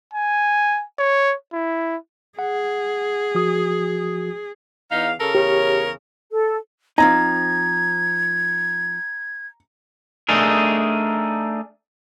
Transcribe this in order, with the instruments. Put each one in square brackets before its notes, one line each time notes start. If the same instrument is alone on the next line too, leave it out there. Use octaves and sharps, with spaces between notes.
[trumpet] G#5
C#5
E4
[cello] G#4 [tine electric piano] F#5
[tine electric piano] F3 F#4 D#6
[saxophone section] E2 F5 [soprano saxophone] D#4
[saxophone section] C#3 A4 [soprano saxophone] A#4
[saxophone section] E2 C#3 C#5 [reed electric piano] G4
[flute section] A4
[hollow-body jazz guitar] F3 C4 D#4 [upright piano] A#5 [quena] G#6
[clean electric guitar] A3 D4 D#4 G#4 A#4